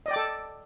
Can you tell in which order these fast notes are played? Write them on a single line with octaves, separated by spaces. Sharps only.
D#5 D5 G5 D6 A4